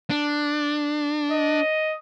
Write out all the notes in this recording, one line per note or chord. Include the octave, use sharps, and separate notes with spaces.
D4
D#5